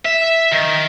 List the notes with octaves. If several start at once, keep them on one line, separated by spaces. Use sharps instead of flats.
E5
D#3